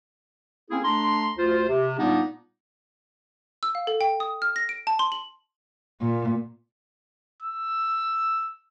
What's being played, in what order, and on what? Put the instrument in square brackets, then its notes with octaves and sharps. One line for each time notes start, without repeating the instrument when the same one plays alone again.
[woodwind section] A#3 C4 C#4 E4 G#4
A3 D4 A#5 C6
D2 F4 C5
C3
A#2 G3 A#3 B3 D4 D#4
[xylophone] E6
F5
A4
G5
D#6
F6
A#6
D7
A5
C6
F#7
[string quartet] A#2
[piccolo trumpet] E6